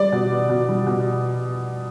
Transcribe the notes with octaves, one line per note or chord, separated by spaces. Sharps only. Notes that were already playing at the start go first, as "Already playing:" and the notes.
Already playing: G3 D5
B2
B3
B2
G3
B2